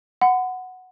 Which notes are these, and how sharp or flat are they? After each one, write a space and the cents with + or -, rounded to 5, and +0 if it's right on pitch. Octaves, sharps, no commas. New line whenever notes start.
F#5 +0 B5 +45